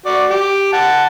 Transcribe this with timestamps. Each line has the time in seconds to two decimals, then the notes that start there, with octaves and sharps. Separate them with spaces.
0.06 F#4 D5
0.30 G4
0.73 F#5 A5